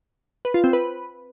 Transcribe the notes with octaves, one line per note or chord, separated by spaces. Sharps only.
B4
F4
C4
B4